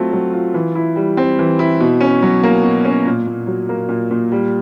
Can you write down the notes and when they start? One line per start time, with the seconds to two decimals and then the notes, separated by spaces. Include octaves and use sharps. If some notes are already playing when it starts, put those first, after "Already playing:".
Already playing: F#3 A3 C4 F4
0.13 F#3
0.33 F4
0.54 E3
0.75 E4
0.96 G3
1.17 C4
1.39 E3
1.59 E4
1.80 B2
2.01 C#4
2.22 F#3
2.43 A#3
2.64 B2
2.85 C#4
3.06 A#2
3.27 A#2
3.47 F#3
3.69 A#3
3.89 A#2
4.11 A#2
4.32 G3